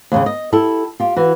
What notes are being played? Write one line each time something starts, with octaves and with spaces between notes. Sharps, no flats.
D#2 A2 C#3
D#5
E4 G4 A4
F4 G4
E3 F#4